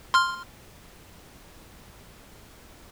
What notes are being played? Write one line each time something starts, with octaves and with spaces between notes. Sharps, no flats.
C6 F6